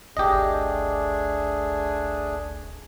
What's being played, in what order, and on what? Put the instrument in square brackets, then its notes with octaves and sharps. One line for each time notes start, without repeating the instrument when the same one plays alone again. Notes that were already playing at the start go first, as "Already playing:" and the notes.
[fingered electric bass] D1 G#1 [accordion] A3 D4 G#4 [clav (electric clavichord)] G4 D#5